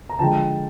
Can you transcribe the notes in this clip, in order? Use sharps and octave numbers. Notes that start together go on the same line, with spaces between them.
A#5
D3 F3 G#3 G5 A5